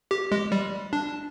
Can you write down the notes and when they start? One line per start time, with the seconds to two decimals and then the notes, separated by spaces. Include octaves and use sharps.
0.11 G4
0.32 G#3
0.52 G3
0.93 D4